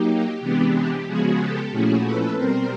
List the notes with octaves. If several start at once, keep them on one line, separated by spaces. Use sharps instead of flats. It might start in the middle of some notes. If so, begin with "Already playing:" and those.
Already playing: F#3 A#3 D#4 G4
C3 E3 G#3 B3 D4
G4
C#3 F3 G#3 B3 F#4 G#4
G4 A4
A#2 F3 A3 C#4 E4 F#4 G#4
A4 B4
B2 G3 C4 A#4 C5